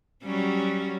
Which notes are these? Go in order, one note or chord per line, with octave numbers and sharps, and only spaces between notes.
F#3 G3 C#4